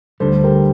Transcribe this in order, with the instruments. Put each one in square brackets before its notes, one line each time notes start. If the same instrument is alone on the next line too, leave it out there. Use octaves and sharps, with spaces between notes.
[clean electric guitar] D2 D3 G3 [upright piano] A4 C5
[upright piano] G4 A#4